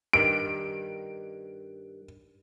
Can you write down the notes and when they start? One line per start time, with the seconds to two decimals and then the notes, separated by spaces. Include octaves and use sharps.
0.13 G2 D#3 D7